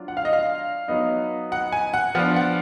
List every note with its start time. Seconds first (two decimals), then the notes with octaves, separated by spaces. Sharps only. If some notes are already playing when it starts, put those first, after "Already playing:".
Already playing: F#3 D4 F4
0.08 F#5
0.17 F5
0.25 D#5
0.33 F5
0.88 F#3 B3 D#4
1.52 F#5
1.72 G#5
1.94 F#5
2.15 F3 B3 D4 F4 F#5
2.36 F#5